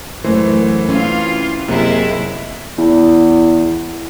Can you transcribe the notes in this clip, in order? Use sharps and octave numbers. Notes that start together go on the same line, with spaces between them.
F#2 E3 A3 C5
C4 C#4 F4 F5
F#2 C3 G#3 A#3 E4
E2